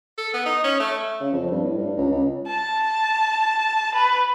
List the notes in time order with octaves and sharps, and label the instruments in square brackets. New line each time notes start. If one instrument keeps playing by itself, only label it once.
[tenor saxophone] A4
B3
D#4
C#4
A3
[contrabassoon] C#3
F2
G2
A2
G2
C#2
C#2
[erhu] A5
B4